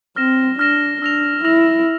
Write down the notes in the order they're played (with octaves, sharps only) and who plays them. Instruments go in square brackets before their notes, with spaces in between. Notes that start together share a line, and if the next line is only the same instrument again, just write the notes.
[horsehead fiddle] C4 [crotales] F6 A#6 E7
[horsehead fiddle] D4 [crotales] F6 A#6 E7
[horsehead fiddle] D4 [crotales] E6 A#6 F7
[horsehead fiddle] E4 [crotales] E6 A#6 F7